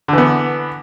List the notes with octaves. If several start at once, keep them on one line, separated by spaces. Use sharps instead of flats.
D3 E3 B3